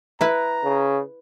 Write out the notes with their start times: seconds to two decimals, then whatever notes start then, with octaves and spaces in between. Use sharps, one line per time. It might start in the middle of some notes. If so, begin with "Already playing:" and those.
0.21 E4 B4 A#5
0.64 C#3